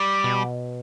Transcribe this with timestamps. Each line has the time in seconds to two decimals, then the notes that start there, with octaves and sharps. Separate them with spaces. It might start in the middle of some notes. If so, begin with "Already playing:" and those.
Already playing: G3
0.24 B2